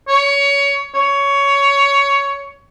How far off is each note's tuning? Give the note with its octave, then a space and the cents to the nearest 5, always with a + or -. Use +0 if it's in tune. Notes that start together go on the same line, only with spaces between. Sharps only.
C#5 +20
C#5 +15